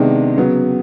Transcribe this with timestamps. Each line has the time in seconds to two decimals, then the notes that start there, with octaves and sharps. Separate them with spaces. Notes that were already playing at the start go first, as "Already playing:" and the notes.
Already playing: C3 D#3 G#3 B3 D4
0.36 C#3 F#3 B3